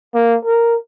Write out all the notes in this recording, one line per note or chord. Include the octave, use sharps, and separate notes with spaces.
A#3
A#4